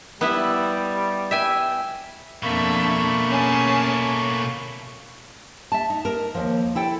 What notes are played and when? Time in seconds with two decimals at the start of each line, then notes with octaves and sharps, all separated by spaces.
0.21 G3 B3 E4 E5
1.31 E5 G5 G#5
2.43 F2 B2 A3 A#3 D4 E5 B5 C#6
3.29 C#4 G#4 A5
5.72 E5 A5
5.90 D#4
6.05 A#4
6.35 D#2 F3
6.75 E4 A4 G5